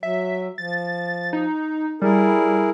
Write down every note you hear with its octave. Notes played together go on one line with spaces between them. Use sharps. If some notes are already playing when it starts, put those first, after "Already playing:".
F#3 E5
F3 A6
D#4
G3 E4 G#4 A#4